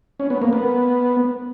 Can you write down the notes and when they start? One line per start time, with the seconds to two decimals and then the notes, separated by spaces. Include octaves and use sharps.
0.20 C#4
0.30 B3
0.42 A#3
0.53 B3